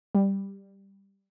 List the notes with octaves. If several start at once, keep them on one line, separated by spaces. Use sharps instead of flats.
G3